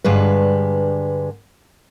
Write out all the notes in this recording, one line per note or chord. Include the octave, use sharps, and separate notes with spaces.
G2 D3 G#3 B4